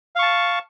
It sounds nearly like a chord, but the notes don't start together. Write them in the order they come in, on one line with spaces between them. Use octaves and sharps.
F5 C#6 A5